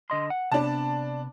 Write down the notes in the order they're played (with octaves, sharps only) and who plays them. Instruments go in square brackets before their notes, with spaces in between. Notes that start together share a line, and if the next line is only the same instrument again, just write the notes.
[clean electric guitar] D3 D#5 C6
F#5
[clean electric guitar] C3 B3 [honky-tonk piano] D4 A5